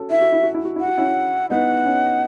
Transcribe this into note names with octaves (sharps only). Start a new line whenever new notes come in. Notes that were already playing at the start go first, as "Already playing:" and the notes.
Already playing: C#4 F#4 A4
E4 E5
F#4
E4
F#4
E4
F#4
E4 F#5
F#4
C#4 E4
B3 D#4 F#5
C#4